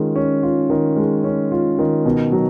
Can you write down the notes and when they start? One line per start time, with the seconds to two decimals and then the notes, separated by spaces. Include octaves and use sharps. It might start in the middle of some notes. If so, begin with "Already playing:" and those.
Already playing: D#3 G#3 C#4 F4
0.16 C#4
0.43 F4
0.70 D#3
0.96 G#3
1.24 C#4
1.51 F4
1.79 D#3
2.05 B2
2.32 F#3